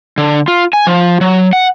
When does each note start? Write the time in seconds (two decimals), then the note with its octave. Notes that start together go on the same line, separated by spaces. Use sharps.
0.18 D3
0.48 F4
0.73 G#5
0.87 F3
1.21 F#3
1.53 F#5